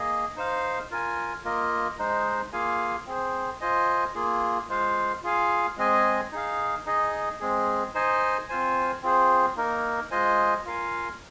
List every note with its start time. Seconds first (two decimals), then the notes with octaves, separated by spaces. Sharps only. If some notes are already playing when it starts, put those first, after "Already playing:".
Already playing: A#3 G#4 D#5
0.36 D#4 C5 F5
0.91 F4 A#4 G#5
1.45 A#3 F4 A#4 D#5
1.98 G#3 D#4 C5
2.53 A#3 F4 G#4 F5 G#5
3.07 C4 G#4 C5
3.61 F4 C5 D#5 G#5
4.15 A#3 F4 G#4
4.69 G#3 F4 C5 F5
5.23 F4 G#4 F5 G#5
5.77 G#3 C4 G#4 D#5 G#5
6.32 D#4 G#4 F5
6.86 D#4 G#4 D#5
7.40 G#3 C4 G#4
7.94 D#4 C5 D#5 G#5
8.49 C4 F4 C5 G#5
9.03 C4 F4 G#4 C5
9.57 A#3 D#4 A#4
10.11 G#3 F4 C5 D#5 G#5
10.65 F4 A#4 F5 G#5